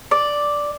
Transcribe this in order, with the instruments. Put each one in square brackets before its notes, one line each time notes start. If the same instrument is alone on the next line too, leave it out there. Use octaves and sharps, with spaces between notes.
[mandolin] D5